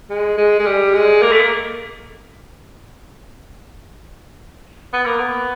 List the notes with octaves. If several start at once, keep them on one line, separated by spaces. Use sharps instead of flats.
G#3
G#3
G#3
G3
G#3
A#3
A3
A#3
B3
A#3
B3